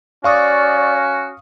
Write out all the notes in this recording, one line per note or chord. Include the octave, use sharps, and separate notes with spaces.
C#4 F#4 D5 F5 C#6 D#6